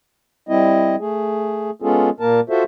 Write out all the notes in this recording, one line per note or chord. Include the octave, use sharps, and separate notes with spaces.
G3 C4 E4 D#5
A3 G#4
G#3 B3 C#4 F4 G#4 A4
A#2 A#3 A#4 A5
F4 F#4 A4 C5 E5